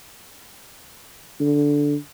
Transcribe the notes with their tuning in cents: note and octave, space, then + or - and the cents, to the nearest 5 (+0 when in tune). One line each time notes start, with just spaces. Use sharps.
D3 -10